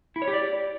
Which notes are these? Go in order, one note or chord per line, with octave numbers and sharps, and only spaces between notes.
E4
C#5
G4
D5